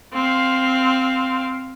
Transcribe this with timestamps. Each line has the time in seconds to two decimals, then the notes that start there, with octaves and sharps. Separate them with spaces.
0.13 C4 F5